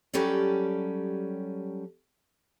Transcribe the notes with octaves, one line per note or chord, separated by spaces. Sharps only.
F#3 G3 C#4 G4 A4 D5